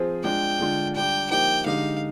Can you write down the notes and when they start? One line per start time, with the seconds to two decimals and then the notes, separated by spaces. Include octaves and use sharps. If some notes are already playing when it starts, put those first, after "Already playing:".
Already playing: F3 C4 F4 G#4
0.24 G#3 D4 F4 G#4 G5
0.60 D3 G#3 D4 F4
0.95 G3 D4 G4 G5
1.30 F3 A#3 D#4 G4 G5
1.66 D3 G#3 D#4 G4 F5